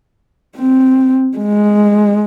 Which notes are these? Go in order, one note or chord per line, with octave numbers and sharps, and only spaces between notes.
C4
G#3